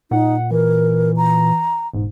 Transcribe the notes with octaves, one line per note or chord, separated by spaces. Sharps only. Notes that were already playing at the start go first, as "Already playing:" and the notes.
A#2 D#4 F#5
E3 A#4
A#5
E1 G#2